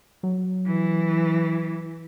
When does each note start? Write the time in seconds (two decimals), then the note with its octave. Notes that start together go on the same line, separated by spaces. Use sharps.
0.23 F#3
0.66 E3